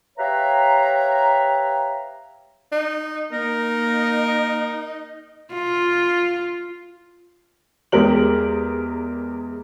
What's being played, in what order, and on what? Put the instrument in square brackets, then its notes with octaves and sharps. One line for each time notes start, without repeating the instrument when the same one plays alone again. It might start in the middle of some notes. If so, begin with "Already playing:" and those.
[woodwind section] G4 B4 C#5 E5 F5 A#5
[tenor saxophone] D#4
[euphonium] A#3 [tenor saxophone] D#4 [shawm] A#4
[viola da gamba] F4
[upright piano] E2 G#3 G4 A#4 F#7